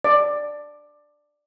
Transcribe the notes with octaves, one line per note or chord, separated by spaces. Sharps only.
D5